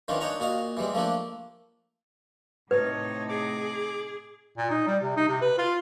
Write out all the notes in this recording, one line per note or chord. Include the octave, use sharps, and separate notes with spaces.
D#3 E3 C#4 D4 F4
D4 D#4 C#5 F#5 A#5 C#6
A#2 F#4 D#5 F5
E3 G3 G#3
F3 A3 A#3 D4
A2 C3 D#4 B4 C#5
G#4 D6
A#2
D#4
G3
C3
D#4
C3
B4
F4